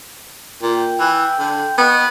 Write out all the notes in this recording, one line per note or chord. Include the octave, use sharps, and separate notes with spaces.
A#2 G5
E3
D3
B3 F#4 D#5 G5